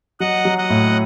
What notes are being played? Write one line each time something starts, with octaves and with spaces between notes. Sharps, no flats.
F#3 D#5 F#5
F#3
D#5 F#5
A2